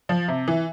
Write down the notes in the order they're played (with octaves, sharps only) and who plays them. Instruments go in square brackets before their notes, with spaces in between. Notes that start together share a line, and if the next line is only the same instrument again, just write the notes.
[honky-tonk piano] F3
C3
E3